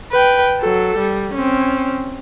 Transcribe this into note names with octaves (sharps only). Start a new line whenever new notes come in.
B4 G5
F#3 A4
G3
C4 C#4